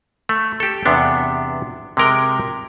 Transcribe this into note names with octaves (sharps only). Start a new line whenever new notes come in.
A3
G4 A4
E2 C3 B3 D4
C3 G#3 A#4 G5